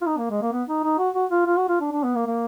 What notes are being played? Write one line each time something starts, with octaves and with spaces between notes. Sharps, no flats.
F4
D#4
A#3
G#3
A#3
B3
D#4
D#4
F#4
F#4
F4
F4
F#4
F4
D4
D4
B3
A#3
A#3